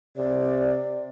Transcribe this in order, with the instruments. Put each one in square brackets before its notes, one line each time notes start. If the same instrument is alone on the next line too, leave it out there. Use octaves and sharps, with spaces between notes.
[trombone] C3 [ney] D5